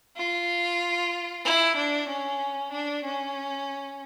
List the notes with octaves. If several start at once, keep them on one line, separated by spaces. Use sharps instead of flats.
F4
E4
D4
C#4
D4
C#4